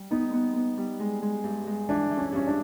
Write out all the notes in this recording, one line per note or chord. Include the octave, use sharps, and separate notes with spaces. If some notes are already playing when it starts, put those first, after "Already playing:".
Already playing: G3
B3 D#4
B3
B3
G3
G#3
G#3
G2
G#3
E3 D4
E3
C#4
G2 C#4
D4